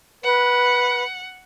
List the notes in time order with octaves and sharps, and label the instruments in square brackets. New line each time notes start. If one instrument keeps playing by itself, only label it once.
[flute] B4 [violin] F#5